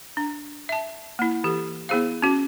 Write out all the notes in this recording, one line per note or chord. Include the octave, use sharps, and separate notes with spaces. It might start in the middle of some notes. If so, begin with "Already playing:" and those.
D4
E5 A5
A#3 E4
E3 G4 A4
B3 E4 G#4 C5 F5
C#4 F#4